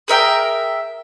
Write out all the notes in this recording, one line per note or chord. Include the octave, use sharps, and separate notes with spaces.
G#4 A#4 E5 G5